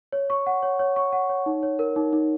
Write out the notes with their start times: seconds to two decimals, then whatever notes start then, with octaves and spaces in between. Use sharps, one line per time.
0.12 C#5
0.30 C#6
0.46 F#5
0.63 C#5
0.79 C#5
0.96 C#6
1.13 F#5
1.29 C#5
1.46 D#4
1.63 C#5
1.79 A#4
1.96 D#4
2.13 D#4